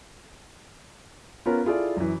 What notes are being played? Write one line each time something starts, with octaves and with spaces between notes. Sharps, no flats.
B3 C#4 F4 A#4
E4 F4 G#4 A4 D5
F#2 E3